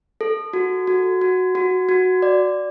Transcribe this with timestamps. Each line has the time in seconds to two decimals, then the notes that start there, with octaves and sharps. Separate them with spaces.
0.21 A4
0.53 F#4
0.87 F#4
1.21 F#4
1.55 F#4
1.89 F#4
2.22 D5